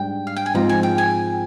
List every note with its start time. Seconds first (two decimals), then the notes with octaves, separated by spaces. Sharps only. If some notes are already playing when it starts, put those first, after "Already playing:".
Already playing: G#2 G3 D4 G5
0.27 F5
0.36 G5
0.46 G#5
0.55 G#2 F3 C4 F4 A#5
0.69 G#5
0.83 G5
0.98 G#5